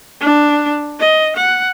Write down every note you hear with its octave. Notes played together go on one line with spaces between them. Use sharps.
D4
D#5
F#5